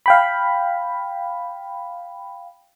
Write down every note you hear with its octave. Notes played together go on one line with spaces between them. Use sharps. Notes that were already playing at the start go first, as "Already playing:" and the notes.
F5 G5 B5